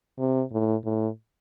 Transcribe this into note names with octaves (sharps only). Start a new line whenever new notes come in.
C3
A2
A2